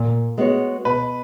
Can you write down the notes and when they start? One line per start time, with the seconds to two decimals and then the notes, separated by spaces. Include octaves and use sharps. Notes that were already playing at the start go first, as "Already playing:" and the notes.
Already playing: A#2
0.38 G#3 B3 F#4 C#5
0.85 B2 B4